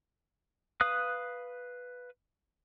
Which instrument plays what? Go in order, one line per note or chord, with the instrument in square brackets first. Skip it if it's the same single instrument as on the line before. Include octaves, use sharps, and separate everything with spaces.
[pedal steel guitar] B4 F5 D#6 F#6